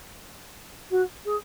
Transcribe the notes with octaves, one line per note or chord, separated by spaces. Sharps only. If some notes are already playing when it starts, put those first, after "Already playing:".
F#4
G#4